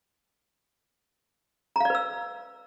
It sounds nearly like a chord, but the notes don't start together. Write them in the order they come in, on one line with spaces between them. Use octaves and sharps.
A#5 F5 D5 B4 E6